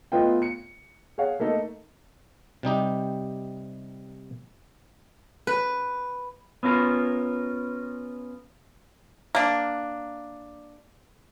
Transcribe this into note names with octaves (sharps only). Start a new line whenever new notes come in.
A3 B3 F4 D#5 G5
C#7
G#4 C#5 F5 F#5
A3 A#3 D#4 A4
C3 G3 D#4 G4
B4
B3 C#4 F4 A#4
A#3 D4